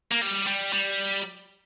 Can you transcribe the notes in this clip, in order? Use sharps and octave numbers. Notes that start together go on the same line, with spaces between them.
A#3
G3
G3
G3